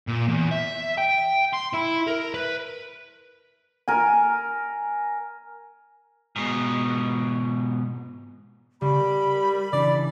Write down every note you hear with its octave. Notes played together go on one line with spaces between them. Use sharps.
A#2
E2
E5
G5
C6
E4
A#4
B4
A#4 G#5
G#2 B2
C#3 G3 B5
A#4
C#3 E3 D4 D5